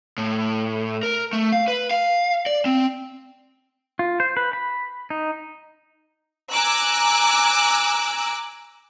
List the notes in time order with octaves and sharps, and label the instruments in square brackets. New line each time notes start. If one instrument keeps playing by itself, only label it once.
[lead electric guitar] A2
A#4
A3
F5
B4
F5
D5
C4
[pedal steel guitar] F4
C5
B4
B5
D#4
[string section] G#5 A#5 D6 E6 F#6